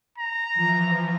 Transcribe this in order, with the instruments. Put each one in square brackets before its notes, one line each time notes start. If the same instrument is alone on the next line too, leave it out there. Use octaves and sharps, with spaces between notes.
[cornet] A#5
[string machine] E3 F3